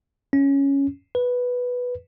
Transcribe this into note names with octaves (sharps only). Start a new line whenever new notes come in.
C#4
B4